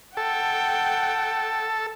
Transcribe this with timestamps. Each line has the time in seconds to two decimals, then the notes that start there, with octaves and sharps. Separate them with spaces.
0.17 A4 F#5 G5